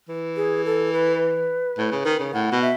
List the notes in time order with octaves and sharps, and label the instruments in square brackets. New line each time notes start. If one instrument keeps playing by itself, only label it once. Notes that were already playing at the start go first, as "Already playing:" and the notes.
[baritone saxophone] E3
[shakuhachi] G#4
A4
B4
[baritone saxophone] A2
C#3
D#3
C#3
[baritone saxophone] A2 [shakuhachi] F#5
[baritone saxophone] B2
[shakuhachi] E5